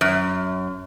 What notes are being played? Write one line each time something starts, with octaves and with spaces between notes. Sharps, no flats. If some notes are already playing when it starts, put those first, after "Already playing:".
F#2